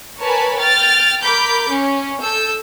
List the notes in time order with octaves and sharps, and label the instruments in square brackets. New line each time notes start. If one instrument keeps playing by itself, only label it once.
[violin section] A#4 B4 C#5 G#5 A5 B5
G5 F6 A6
A#4 B5 D6 G6
C#4
A4 E6 G6